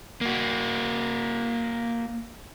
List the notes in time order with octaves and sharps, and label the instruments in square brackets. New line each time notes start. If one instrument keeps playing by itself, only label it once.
[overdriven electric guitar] A#3 F#4